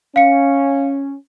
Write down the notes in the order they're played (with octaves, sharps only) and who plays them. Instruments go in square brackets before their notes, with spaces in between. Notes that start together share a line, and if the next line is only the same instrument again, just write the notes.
[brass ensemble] C#4 [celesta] F5 C#7